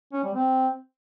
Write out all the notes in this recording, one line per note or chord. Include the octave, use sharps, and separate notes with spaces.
C#4
G3
C4